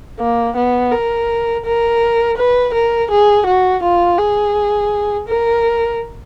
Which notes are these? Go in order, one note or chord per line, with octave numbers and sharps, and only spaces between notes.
A#3
B3
A#4
A#4
B4
A#4
G#4
F#4
F4
G#4
A#4